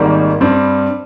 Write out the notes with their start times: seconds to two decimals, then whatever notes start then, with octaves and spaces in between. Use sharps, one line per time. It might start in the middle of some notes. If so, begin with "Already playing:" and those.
Already playing: G#1 G#2 D#3 G3 A#3
0.41 G2 G3 C4